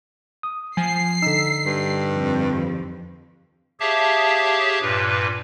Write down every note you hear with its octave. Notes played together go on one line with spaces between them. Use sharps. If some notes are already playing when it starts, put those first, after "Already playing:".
D#6
F3 G#5 C7
D3 D#4 E6 B6
G2
F2
G4 G#4 C#5 E5 F5 A5
G2 A#2 B4